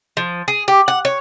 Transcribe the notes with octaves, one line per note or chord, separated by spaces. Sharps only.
F3
G#4
G4
F#5
C#5